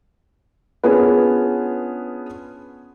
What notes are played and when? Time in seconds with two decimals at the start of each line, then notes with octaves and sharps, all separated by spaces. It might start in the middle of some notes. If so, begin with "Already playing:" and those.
0.83 B3 C#4 D4 F4 G#4 B4